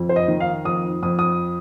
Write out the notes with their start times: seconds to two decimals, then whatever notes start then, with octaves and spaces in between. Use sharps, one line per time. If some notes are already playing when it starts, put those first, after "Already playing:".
Already playing: F2
0.09 C5
0.16 D#5
0.28 D#3
0.40 F5
0.65 F2 D#6
1.03 F2 D#6
1.19 D#6